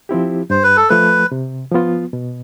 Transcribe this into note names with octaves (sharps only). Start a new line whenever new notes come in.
F3 C4 E4 G4
G2 C5
B4
A4
F3 A3 B4
C3
F3 B3 F4
B2